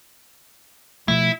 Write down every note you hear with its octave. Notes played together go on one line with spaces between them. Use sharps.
B2 F3 A3 E4